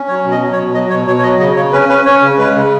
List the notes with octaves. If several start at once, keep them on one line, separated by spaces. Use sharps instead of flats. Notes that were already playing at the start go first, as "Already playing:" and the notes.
Already playing: C#4
F#3 C#5
B2
D#5
F#3
C#5
B2
F#3 D#5
B2 C#5
B2 C#5
C#5
F#3 D#5
C#3 D#5
C#3 C#5
C#4 B4
C#4 B4
C#4 C#5
C#3
G#3 B4
C#3